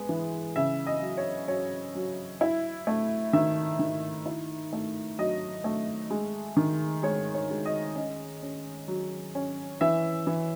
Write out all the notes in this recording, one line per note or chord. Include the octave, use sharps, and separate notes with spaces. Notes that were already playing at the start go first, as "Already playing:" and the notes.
Already playing: G#3 B3
E3
C#3 E5
D#5
F#3
C#5
F#3 C#5
F#3
E4
A3
D#3 E5
D#3
E4
A3
F#3 D#5
A3
G#3
D#3
G#3 C#5
C#5
G#3
D#5
C#4 D#5
C#4
F#3
C#4
E3 E5
E3